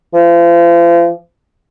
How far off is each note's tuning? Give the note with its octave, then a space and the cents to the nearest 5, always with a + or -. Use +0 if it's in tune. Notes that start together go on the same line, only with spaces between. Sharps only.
F3 -40